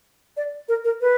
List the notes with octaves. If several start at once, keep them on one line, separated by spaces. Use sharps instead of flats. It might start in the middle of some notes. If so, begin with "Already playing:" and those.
D5
A#4
A#4
B4